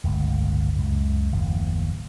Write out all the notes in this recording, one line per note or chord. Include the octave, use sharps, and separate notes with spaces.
D1 G1 C#2 A2
C#2 F#2
F#1 D#2 A2 F3